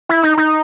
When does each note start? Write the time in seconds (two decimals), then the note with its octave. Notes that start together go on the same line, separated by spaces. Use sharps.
0.09 E4
0.23 D#4
0.37 D#4